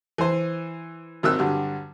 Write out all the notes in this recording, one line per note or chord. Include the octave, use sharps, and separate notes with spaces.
E3 C5
G#1 D#3 F#3 E6 F#6
G2 D3 F#3